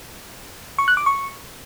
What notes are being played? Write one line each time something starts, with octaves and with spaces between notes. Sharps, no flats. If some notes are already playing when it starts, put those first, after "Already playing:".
C#6
F#6
D6
C#6